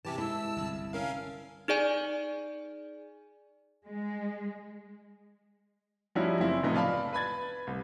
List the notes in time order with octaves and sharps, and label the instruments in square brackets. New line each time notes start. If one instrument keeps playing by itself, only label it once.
[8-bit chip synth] C3 G4 A5 [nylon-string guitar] E3
[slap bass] G#3 [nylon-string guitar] E4 [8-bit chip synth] A5 E6
[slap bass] G1 C2
[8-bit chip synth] C#4 A#4 F5
[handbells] D#4 G#4 D5 G#5
[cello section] G#3
[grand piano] F3 G3 C#4 D#4 E4 F#4
F#1 F#2 C4 E4
A2 C3 F3 A3 B3 D#4
D5 F5 A5 B5
B4 B5 G#6 A6
C2